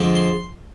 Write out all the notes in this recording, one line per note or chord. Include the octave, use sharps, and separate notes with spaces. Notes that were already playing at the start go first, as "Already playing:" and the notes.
Already playing: F2 D3 F3 G#3
C6